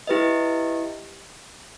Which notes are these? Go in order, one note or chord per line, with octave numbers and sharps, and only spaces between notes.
E4 G4 B4 D#5